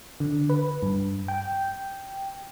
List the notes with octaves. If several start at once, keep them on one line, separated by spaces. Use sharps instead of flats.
D3
B4
G2
G5